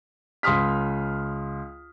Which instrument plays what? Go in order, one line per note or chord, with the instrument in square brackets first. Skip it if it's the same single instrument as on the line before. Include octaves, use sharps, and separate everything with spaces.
[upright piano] C#2 C6 D#6 F6 B6